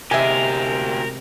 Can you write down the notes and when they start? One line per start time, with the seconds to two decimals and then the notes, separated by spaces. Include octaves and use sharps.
0.11 D2 C3 G#3 G4 A#4 E5 G#5